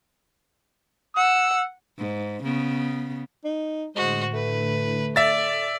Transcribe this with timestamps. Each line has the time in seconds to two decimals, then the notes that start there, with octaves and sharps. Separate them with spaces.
1.17 F#5 E6
1.98 G#2
2.44 C#3 B3
3.44 D#4
3.96 A2 D3 G#3 F#4 C5
4.33 A3 B4
5.16 A4 D5 E5 A6